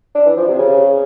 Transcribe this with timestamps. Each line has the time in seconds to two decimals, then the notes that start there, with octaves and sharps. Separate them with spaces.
0.15 D4
0.26 E3
0.36 F3
0.47 C3
0.58 C#3